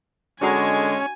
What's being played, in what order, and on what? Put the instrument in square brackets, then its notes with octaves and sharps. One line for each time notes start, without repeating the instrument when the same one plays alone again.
[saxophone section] D3 G#3 [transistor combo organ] C#4 [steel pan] D4 F#4 A#5 [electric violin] G#5